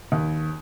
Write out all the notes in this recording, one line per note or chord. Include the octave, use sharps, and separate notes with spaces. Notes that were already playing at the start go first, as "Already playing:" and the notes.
D#2